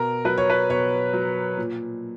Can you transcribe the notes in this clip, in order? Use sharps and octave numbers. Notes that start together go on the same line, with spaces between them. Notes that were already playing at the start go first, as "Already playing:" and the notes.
Already playing: B2 A#4
F#3 B4
C#5
B4
B2 C#5
F#3
A#2